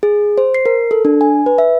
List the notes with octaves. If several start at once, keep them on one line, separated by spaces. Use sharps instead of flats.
G#4
C5
C7
A#4
A4
D4
G#5
B4
E5